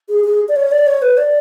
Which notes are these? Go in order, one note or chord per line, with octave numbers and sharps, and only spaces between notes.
G#4
G#4
D5
C#5
D5
C#5
B4
D5